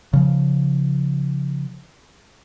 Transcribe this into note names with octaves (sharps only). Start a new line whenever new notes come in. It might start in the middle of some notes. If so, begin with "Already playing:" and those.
C#3 F3